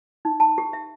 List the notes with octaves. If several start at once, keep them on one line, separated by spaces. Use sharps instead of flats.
D#4
A5
G4
E5